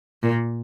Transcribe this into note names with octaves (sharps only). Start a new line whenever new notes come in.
A#2